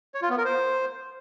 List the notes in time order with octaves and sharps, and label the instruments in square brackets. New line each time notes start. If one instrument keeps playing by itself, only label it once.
[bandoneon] C#5
F4
B3
A#4
C5